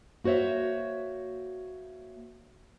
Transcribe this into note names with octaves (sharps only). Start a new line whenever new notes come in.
A#3 F#4 C5 C#5 E5